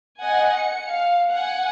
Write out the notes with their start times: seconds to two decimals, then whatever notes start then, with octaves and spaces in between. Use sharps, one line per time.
0.21 D#5 F#5 G#5
0.57 C#7
0.90 F5
1.31 F#5 G#5